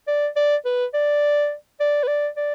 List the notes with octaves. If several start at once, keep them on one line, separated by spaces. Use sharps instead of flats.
D5
D5
B4
D5
D5
B4
D5
D5